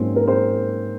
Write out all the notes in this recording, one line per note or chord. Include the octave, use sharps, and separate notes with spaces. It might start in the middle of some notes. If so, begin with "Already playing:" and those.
Already playing: G#2 F#3 A#3 C4 C#4
A#4
C4 C5